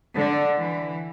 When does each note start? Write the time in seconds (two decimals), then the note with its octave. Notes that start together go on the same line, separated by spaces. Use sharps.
0.15 D3
0.60 E3